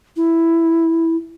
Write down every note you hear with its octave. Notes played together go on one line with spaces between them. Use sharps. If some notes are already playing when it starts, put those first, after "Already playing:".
E4